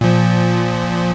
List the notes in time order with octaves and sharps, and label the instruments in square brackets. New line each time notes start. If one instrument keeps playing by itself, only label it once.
[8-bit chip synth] A#2 F3